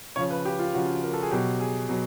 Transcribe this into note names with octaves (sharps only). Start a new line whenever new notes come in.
C#3 F3 C#5
B4
G4
F4
C#3 F3 F#4
A#4
A4
G#4
B2 F#3 G4
G#4
B2 F#3